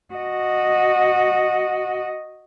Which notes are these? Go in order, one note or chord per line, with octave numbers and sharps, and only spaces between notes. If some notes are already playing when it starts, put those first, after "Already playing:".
F#4 D#5